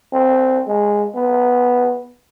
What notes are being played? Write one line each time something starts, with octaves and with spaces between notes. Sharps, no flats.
C4
G#3
B3